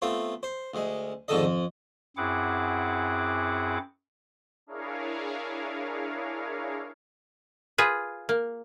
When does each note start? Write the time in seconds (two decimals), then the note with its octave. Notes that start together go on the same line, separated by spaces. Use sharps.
0.02 A3 B3 C4 F4
0.43 C5
0.74 D2 G#3
1.28 F2 G#2 D3 D#3 A4 D#5
1.44 F2
2.17 F#2 C4 E4 G#4 F#5 D6
4.67 D4 E4 G#4 A#4 C#5 F5
7.78 F4 G#4 B4
8.29 A#3